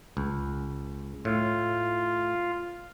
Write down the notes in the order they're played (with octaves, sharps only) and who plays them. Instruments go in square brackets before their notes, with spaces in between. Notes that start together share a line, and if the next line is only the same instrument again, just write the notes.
[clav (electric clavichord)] C#2
[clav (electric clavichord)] A2 [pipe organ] F4